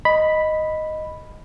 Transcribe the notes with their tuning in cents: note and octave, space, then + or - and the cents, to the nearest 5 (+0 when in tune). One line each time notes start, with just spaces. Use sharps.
D#5 +0 B5 +0